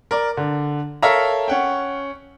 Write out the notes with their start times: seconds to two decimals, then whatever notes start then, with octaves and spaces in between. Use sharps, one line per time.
0.11 A#4 D5
0.37 D3
1.03 A4 A#4 C#5 E5 F5 A#5
1.48 C#4 F#5 G5